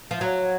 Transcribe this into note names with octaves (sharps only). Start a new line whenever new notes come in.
F3
F#3